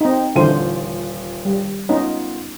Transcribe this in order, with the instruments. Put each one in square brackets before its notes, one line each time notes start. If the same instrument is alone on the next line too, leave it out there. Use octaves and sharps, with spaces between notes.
[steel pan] C4 D#4
[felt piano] D#1 F4 D#7 [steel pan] D3 E3 C5
[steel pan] G3
[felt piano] B3 F4 [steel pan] C#4 D#4